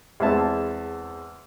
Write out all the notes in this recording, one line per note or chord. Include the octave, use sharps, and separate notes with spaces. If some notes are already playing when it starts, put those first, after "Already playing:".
E2 G#3 C4 E5 A5